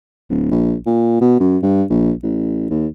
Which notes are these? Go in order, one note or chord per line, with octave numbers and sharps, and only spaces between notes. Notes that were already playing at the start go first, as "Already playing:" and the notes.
D1
A#1
A#2
B2
F#2
G2
A#1
A1
D#2